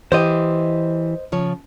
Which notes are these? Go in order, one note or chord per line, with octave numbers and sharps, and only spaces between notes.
E3 G4 C5 D#5
C#3 F3 C#5